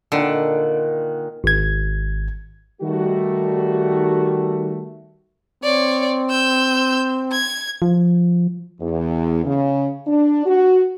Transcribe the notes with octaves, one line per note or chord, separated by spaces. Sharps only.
A#2 D3 D#3 F#5
G#1 G#6
D#3 G3 A3 F#4
C4 C#5 D5
E6 G6
G#6
F3
E2
C#3
D4
F#4